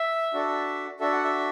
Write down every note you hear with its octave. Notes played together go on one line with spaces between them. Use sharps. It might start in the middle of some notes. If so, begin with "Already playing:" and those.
Already playing: E5
D4 F#4 A4
D4 F#4 A4 E5
F#5
E5